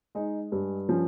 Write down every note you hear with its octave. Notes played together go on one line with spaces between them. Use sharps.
G#3 D#4
G2
F3 C#4